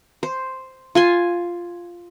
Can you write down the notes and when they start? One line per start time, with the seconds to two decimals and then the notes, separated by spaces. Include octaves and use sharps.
0.23 C5
0.95 F4 G#5 C6